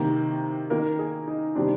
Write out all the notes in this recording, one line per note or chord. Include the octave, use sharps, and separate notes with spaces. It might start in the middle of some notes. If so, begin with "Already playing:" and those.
Already playing: C3 D#3 A#3
D#3 A#3 A#4
G#4
D#4
C3 D#3 G3 C4 D4